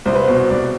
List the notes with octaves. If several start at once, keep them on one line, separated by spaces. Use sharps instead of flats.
C2 C5
B4
B2 C5
C2 D5